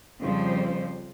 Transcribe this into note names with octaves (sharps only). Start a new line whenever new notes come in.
F2 C#3 F3 G3 C5